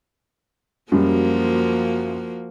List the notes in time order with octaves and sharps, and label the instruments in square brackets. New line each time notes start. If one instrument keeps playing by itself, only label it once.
[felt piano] F#2 G3 [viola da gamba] F3 A#3 F#4